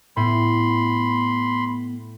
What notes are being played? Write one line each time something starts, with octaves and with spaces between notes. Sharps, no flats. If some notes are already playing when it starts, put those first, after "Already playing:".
A2 B3 B5 C6